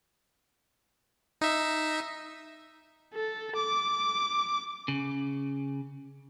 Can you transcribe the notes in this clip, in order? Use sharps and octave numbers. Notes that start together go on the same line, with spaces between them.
D#4 E5
A4
D6
C#3